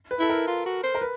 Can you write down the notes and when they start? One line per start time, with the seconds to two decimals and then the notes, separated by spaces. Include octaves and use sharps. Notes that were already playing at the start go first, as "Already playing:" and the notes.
0.11 B4
0.20 E4 A4
0.29 A#4
0.47 F4
0.66 F#4
0.83 C5
0.95 A#4
1.01 B4